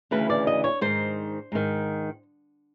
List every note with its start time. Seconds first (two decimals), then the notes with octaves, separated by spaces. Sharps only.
0.11 D2 C#3 E3 B4
0.30 D5
0.47 D#5
0.64 C#5
0.81 G#2 D#3 C5
1.52 G#2 D#3